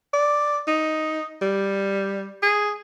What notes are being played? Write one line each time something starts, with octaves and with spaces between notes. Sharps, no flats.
D5
D#4
G3
G#4